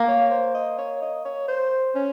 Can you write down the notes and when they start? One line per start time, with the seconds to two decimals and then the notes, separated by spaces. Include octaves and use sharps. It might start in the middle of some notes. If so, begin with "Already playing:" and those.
Already playing: A#3
0.08 C#5
0.31 C5
0.55 D#5
0.78 C#5
1.02 D#5
1.25 C#5
1.48 C5
1.95 C#4